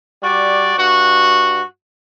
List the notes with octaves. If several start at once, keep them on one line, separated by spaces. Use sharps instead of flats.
G3 F#4 D5
G2 F#4